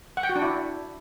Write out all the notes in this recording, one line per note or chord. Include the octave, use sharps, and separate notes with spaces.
F#5
G5
F#4
D4
E4